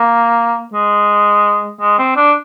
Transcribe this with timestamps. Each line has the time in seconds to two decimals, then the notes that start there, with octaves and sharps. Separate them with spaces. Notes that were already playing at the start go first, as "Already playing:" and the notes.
Already playing: A#3
0.74 G#3
1.81 G#3
1.99 C4
2.16 D4